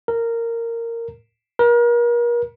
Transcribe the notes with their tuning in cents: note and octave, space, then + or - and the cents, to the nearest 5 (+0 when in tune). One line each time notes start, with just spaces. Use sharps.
A#4 -15
A#4 +35